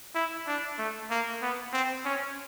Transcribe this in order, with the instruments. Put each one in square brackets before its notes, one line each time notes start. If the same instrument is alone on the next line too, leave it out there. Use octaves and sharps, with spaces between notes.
[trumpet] E4
D4
A3
A#3
B3
C4
C#4